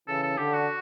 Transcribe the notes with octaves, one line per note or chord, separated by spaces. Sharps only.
C#3 E3 A4
A4
D3 G4
F#4